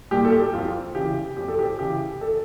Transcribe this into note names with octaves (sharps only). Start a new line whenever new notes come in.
A#2 G3 G4
A4
G4
F2 F4
C#3 E3 G4
F2 G4
A4
G4
C#3 E3 G4
A4